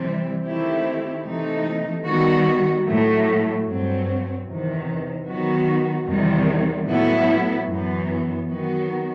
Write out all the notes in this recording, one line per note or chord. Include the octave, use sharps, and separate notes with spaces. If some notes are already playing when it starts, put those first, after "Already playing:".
Already playing: C3 E3 G3 C4
D#3 A3 C4 E4 G4
C3 E3 A3 D#4
D#3 G3 B3 F#4
A2 F#3 A3
G2 F#3 C4
E2 C3 D#3
D#3 F#3 B3 F#4
E2 C3 D#3 G3
A2 F#3 B3 E4
F#2 E3 B3
D#3 F#3 B3 F#4